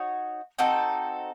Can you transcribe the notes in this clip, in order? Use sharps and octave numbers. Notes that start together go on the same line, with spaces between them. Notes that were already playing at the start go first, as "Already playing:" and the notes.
Already playing: D#4 F#4 C#5
C4 D#4 F#4 A4